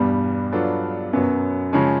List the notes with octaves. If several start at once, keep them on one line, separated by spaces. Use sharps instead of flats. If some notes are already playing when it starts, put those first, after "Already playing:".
Already playing: E2 G2 B2 G3
F#3 B3 D4 F4 A4
F#2 B2 F#3 B3
C#3 F3 G#3 C#4